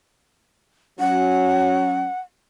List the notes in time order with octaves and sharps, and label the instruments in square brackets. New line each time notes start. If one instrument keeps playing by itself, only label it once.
[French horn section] F#3 C#4 [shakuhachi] F#5